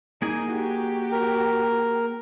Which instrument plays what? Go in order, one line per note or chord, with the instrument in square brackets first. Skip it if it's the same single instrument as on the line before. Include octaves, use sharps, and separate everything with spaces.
[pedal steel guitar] A#3 G#4 G#5 [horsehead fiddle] D#4
[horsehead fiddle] F#4 G4
[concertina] A#4